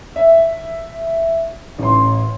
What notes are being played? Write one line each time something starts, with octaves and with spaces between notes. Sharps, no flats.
E5
A1 C6